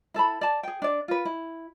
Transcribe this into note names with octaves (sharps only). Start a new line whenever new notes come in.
E4 A4 A5 B5
D5 A5
G#4 G5
D4 D5
F4 B4
E4